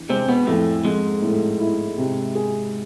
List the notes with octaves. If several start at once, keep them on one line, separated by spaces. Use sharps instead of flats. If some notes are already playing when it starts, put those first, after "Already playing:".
Already playing: E2 D4
C3 G#3 C4
B2 B3
F2 A2 A3
F2 G#2 G#3
A2
E4
C3
G#4